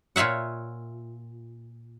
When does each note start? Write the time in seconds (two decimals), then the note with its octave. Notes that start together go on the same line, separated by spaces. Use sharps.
0.16 A#2 F4 C#5 E5 F#5